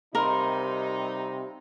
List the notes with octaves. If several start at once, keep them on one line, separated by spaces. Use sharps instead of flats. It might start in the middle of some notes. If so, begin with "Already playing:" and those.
C3 G3 D#4 A#4 F5 B5 C6